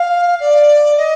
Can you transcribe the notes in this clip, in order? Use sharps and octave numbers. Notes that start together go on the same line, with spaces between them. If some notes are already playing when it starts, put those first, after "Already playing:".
Already playing: F5
D5
D#5